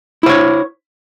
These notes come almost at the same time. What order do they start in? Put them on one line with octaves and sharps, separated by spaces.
E4 C5 C#5